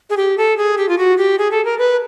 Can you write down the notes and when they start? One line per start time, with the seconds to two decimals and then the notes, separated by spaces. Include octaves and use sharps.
0.10 G#4
0.17 G4
0.38 A4
0.57 G#4
0.77 G4
0.89 F4
0.98 F#4
1.18 G4
1.39 G#4
1.51 A4
1.65 A#4
1.79 B4